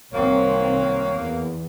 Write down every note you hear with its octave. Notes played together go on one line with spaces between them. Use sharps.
C2 D#3 F#3 A#3 C4 C#5
E2